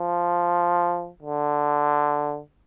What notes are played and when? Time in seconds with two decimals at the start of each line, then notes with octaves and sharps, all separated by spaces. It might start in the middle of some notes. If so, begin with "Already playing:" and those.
Already playing: F3
1.22 D3